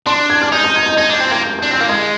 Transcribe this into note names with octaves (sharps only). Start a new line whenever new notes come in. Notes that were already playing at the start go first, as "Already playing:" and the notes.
D4 C6
G#6
F6
D#4 G6
G6
G#6
G6
D#4 G#6
D4 G6
C4
A#3 G#6
G6
D4 G6
C4 G6
A#3
G#3 G#6